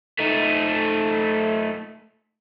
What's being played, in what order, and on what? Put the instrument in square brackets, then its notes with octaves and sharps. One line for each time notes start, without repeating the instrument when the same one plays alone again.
[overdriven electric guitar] A3 D#4